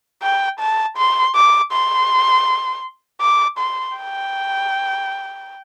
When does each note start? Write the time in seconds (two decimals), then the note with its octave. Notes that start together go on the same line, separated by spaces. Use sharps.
0.22 G5
0.60 A5
0.97 C6
1.35 D6
1.72 C6
3.21 D6
3.58 C6
3.97 G5